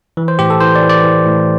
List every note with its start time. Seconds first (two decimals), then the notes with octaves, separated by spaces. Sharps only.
0.17 E3
0.28 C5
0.39 A2 G4
0.50 A4
0.61 E3 C5
0.75 D5
0.82 E3
0.89 D5
1.04 E3
1.26 A2